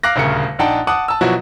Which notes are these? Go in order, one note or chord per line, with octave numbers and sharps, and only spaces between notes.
F5 D6 F#6 A#6
D#1 D2 C#3 A#4 C#7
A#1 D4 D#4 F#5 G5 A5
F#5 A5 D6 D#6 F#6
A5 E6
B2 F3 F#3 E4 F#4